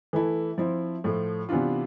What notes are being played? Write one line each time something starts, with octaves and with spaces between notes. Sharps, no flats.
E3 A3 E4 A4
F3 C4 E4
A2 F3 A3
C3 E3 B3 D4 F4